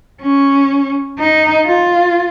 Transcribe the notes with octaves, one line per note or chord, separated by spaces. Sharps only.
C#4
D#4
F4